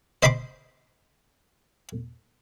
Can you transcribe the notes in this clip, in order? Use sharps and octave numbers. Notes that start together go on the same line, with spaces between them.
C5 D#5 B5 C6 D6